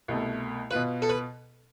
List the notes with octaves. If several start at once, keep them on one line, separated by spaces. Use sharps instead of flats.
C2 B2 A3
B2 B3 F4 B4
A4
B4